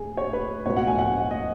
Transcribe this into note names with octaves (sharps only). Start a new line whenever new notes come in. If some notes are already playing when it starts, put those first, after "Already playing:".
Already playing: G#4
C#5
B4
C#2 B2 C#5
F#5
G#5
F#5
D#5